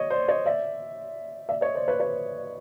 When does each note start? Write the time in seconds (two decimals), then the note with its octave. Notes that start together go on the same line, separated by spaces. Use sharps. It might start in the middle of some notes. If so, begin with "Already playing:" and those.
Already playing: C#5 D#5
0.10 C5 D5
0.28 C#5 D#5
0.45 D5 E5
1.49 D5 E5
1.61 C#5 D#5
1.74 C5 D5
1.88 B4 C#5
2.00 B4 C#5